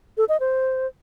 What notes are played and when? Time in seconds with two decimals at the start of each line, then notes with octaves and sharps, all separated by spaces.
0.17 A4
0.29 D#5
0.40 C5